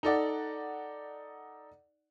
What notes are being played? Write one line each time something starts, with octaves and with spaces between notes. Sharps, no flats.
D#4 A4 D5 F#5